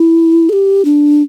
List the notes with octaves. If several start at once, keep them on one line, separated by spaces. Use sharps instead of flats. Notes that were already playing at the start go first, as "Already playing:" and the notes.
Already playing: E4
A4
G4
D4